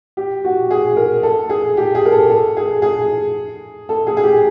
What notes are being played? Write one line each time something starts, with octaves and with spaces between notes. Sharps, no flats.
G4
F#4
G#4
A#4
A4
G#4
G4
G#4
A#4
A4
A4
G#4
G#4
A4
G#4
G#4
G4